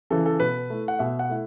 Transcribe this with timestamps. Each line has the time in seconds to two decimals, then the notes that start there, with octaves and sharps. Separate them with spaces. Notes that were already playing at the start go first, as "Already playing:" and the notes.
0.10 C#3 E3 A4
0.26 A4
0.40 B2 B4
0.70 A3 E4
0.88 F#5
0.99 B2 E5
1.19 F#5
1.29 A3 E4